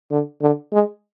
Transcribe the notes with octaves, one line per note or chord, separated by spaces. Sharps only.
D3
D3
G#3